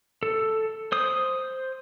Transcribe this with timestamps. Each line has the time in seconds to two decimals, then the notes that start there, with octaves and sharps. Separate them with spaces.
0.23 A4
0.92 C5 D#6